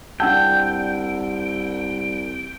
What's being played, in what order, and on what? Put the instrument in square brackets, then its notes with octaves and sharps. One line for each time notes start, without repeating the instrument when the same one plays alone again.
[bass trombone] C2 [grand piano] D4 F#5 E6 [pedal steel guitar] G5 [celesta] A5